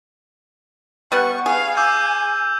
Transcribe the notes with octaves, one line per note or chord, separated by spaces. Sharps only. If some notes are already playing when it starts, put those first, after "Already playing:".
G3 B3 F#5 C#6
G#4 F5
G#5 D6 E6 G6